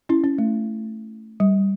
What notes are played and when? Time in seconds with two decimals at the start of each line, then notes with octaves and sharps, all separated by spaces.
0.09 C#4 E4
0.24 C#4
0.38 A3
1.40 G3